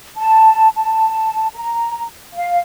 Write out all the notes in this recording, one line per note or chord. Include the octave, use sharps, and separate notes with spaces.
A5
A5
A#5
F5